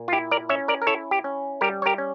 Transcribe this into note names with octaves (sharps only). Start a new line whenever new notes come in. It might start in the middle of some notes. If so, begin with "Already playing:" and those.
Already playing: A#2
F4
E4 G4
A#4 D5
C#4 C#5 E5
A#4 D5
A#4
E4 A4 C#5
G4
C#4
G3 G4 A#4
C#5
G4 A#4
C#4